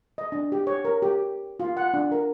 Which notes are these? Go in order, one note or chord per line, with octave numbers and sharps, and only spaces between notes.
D#5
D4
G4
C#5
A#4
G4
F4
F#5
D4
A#4